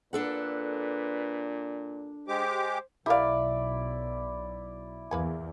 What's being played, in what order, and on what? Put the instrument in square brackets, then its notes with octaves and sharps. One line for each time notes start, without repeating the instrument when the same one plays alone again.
[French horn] A#2 [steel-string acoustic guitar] D4 A4 F#5 [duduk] B4
[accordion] G#3 G4 D6 [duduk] C5
[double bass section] B1 [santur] E4 D5 [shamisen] G4 A#4 F5
[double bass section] E2 [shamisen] A#3 B4 G#5